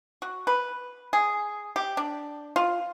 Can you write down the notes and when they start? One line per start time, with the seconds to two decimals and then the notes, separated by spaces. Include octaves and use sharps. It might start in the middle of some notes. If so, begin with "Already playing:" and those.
0.22 F#4
0.47 B4
1.13 G#4
1.76 G4
1.97 D4
2.56 F4